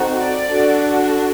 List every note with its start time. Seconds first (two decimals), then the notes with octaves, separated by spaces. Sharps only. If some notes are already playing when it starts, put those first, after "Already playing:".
Already playing: C4 D#4 F#4 A4
0.21 D5
0.51 D4 F#4 A4